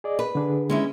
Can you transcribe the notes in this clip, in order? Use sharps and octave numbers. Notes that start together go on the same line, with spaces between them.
G#4 D5 D#5
B4
D3 D4 G#4
G#3 C#4 E4